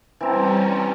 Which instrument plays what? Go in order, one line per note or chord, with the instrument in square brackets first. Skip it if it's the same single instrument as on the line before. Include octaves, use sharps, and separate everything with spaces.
[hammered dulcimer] E3 C4 [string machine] G3 C#4 [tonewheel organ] G5 A5 A#5